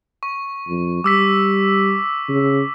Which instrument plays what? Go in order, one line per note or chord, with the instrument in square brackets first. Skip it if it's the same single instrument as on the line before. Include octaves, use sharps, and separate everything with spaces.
[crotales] C#6
[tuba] F2
[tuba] G3 [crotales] D6 E6 B6
[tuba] C#3